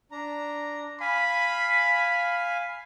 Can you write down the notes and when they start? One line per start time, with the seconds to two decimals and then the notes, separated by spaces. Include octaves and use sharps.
0.11 D4 A#5
1.01 F5 G#5 B5